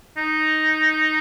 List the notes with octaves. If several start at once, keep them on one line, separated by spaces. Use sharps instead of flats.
D#4